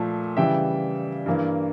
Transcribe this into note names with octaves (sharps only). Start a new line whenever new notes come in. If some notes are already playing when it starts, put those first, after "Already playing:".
Already playing: A#2 F3 A3
C#3 E3 G3 E5 G5
G2 E3 A#3